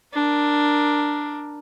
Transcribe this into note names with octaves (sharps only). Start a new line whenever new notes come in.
D4 A#4